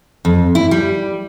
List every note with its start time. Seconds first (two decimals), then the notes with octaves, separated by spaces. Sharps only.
0.25 F2
0.55 E4
0.71 G3